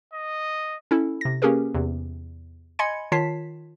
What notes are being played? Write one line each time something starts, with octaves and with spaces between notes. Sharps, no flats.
D#5
C#4 E4 A4
C3 A#6
A#3 C#4 G4 G#4 A#4 B4
E2 C3
D#5 G#5 B5 C6 G#6 C#7
D#3 F4 C#5 A5 B6 C7